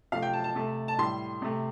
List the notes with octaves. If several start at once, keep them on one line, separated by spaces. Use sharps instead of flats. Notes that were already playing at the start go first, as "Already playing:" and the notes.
C3 F3 A3 F5
G5
A5
A5
C3 A3
A5
A2 G3 C6
C3 A3